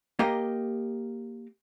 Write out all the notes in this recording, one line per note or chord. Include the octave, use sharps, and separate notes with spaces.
A#3 G4 A#4 D#5 F5 G5